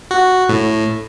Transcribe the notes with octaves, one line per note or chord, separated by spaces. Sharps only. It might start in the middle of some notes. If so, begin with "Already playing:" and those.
F#4
A2